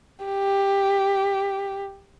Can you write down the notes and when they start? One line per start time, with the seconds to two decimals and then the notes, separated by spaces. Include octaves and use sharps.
0.25 G4